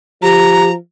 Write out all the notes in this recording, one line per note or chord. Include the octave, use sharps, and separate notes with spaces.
F3 G4 A#5